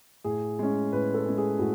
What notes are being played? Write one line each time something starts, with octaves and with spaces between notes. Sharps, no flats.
A2 G#4
G#3 C#4
A2 B4
A4
G#3 C#4
G#4
A2 F#4